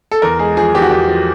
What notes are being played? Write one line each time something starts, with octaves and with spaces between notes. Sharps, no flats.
A4
E2 A#4
G#3 G#4
F3 G#4
E2 G4
F#4
E2 G4
F3